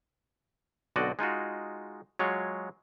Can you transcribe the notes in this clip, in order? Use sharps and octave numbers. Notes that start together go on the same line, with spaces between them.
B1 D3 C4 F#4 D5 D#5
G#3 D#4 F4 F#4
F#3 G#3 F4 C#5